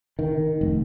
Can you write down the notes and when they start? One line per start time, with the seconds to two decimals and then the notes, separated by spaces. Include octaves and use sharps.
0.19 D#3
0.61 F1